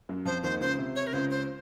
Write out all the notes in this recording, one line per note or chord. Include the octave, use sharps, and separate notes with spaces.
F#2 F#3
F2 F3 C5
D#2 D#3 C5
C#2 C#3 C5
C3
C#5
A#4
C#2 C#3 C5
C5